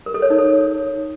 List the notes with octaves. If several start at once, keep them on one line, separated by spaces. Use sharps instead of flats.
A#4
A4
C#5
D#4
A4